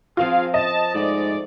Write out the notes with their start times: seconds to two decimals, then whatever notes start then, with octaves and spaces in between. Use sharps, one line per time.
0.17 F3 C4 F4 G#4 A#4 F5
0.54 D#5 A5
0.94 G#2 A3 D5